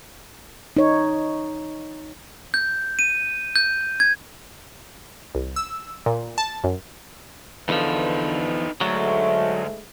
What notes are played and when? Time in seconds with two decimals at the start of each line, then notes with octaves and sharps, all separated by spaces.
0.77 D#4 C#5
2.54 G6
2.99 D#7
3.56 G6
4.00 G#6
5.35 C2
5.56 E6
6.06 A#2
6.38 A5
6.64 F#2
7.69 E2 D3 F3 D#4 B4
8.81 D2 G#2 F#3 G#3 A3